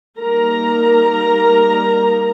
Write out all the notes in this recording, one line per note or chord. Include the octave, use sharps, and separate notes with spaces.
G3 A#3 D#4 A#4 A#5